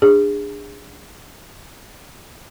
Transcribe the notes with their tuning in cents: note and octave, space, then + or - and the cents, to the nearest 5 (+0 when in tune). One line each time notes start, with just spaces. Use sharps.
D4 +10 G#4 -25